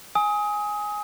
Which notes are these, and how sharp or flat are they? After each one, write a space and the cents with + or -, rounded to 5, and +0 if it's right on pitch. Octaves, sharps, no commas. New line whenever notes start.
G#5 +0 D#6 +25